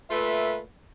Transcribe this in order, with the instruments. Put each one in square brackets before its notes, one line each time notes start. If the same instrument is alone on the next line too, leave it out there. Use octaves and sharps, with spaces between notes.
[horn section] A#2 A3 F4 B4 E5